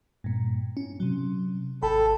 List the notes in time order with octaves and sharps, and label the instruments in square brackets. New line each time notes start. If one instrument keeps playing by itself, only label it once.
[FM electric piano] G2 A#2
C#4
C3 F#3
[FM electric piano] G#1 G5 B5 [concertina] A4